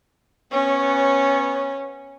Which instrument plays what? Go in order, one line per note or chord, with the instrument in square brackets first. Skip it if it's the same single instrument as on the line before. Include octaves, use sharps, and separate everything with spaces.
[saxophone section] B3 C#5 [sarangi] C#4